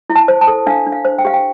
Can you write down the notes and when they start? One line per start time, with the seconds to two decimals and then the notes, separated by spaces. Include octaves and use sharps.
0.10 E4
0.16 A5
0.28 C5
0.41 A5
0.48 A4
0.66 D4 F5
0.87 D4
0.92 F5
1.05 C5
1.19 G5
1.25 G4 F5
1.34 G5